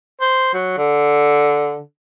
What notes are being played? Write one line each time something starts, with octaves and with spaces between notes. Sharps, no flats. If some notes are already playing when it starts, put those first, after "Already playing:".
C5
F#3
D3